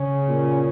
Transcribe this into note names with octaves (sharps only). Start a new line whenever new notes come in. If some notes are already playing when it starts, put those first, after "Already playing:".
Already playing: C#3 C#4
A#2